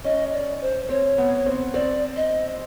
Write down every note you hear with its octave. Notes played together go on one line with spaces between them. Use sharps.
C#4 D#5
D5
C5
C4 C#5
B3
C4
C4 D5
D#5